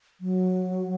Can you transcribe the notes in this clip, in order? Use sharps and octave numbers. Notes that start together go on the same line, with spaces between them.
F#3